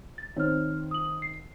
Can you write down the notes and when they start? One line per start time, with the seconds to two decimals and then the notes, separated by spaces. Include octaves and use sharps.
0.18 A6
0.36 D#3 C4 C#5 F6
0.91 D#6 F#7
1.22 C7